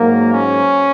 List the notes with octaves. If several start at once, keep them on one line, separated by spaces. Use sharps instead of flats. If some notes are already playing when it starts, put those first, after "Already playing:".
Already playing: G#2 F#3 A#3
C#4